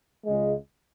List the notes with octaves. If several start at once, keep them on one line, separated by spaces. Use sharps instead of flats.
C#2 C#3 G#3